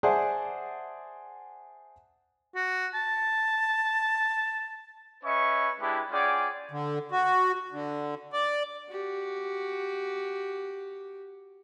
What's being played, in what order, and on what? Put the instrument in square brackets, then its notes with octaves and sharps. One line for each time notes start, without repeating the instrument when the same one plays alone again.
[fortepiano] G#4 C5 D5 E5 F#5 A5
[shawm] F#4
A5
[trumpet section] C#4 B4 D#5 E5 C#6
G#3 D4 E4 G4 B4
C#4 F4 G#4 D5 F#5 G5
[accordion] D3
F#4
D3
D5
[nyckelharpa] F#4 G4